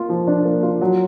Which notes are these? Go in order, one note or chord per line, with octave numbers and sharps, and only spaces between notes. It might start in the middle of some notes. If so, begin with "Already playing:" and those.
Already playing: A#3 F4
F3
D4
A#3
F4
F#3